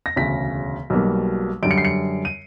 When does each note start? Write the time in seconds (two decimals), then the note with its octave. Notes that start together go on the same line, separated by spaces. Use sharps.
0.06 A#6
0.16 E1 D2 C#3 B6
0.90 B1 B2 G3 A#3
1.63 F#2 D3 G3 D7
1.71 C#7
1.78 C7
1.85 C#7
2.25 D#7